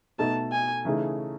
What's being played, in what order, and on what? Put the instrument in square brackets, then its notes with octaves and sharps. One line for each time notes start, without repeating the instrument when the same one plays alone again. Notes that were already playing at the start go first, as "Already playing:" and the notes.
[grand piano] B2 A3 D#4 A4 [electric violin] A5
[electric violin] G#5
[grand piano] C#3 E3 A3 D#4 G#4